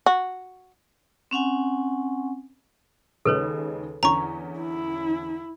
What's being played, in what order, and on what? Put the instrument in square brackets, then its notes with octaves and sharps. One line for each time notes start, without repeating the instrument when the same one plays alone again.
[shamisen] F#4
[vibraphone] C4 C#4 F#5 G#5
[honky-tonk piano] D#2 C#3 G#3 [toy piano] A4 B4 C#5
[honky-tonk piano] E2 D3 C#4 [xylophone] A#5 C#6
[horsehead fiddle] E4